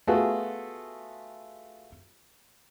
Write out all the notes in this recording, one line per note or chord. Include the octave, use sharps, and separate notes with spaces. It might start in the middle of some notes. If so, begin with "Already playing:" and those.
A3 B3 F4 F#4 G#4 A4